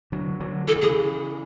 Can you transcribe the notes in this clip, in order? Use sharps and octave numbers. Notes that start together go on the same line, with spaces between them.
D3 F#3
D3 F#3
E3 A4
D3
C#3 E3 G#4